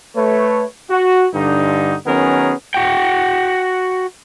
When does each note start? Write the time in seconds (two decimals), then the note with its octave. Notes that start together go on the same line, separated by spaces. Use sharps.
0.16 A3 B4 C#5
0.90 F#4
1.34 G2 D3 D#4
2.06 D#3 F#3 B3 C#4 G#4 A#4
2.74 F#4 G5